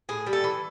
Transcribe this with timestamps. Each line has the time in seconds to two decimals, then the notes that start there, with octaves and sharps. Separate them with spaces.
0.09 A2 G#4
0.26 G3
0.33 A4
0.44 E3